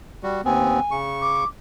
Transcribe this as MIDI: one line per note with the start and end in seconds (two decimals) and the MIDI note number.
0.23 0.41 55
0.23 0.41 66
0.45 0.80 39
0.45 0.80 59
0.45 0.80 60
0.45 0.94 80
0.91 1.44 49
0.91 1.44 85
1.21 1.44 86